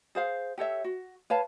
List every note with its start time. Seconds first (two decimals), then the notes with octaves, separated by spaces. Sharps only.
0.15 G#4 C5 F5
0.58 G4 A4 C#5 E5
0.84 F#4
1.30 B4 C#5 F5 A5